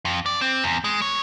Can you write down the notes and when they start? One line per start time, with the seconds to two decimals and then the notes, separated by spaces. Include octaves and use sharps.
0.05 F2
0.26 D5
0.41 C4
0.64 E2
0.84 G#3
1.02 C#5